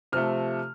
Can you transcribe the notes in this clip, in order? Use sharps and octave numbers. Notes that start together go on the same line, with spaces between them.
C3 F3 A3 F6